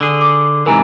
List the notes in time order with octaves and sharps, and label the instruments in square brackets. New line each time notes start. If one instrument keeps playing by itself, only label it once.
[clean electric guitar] D3 G#4
[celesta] D6
[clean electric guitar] G#2 C3 E3 [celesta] A#4 G#5 A#5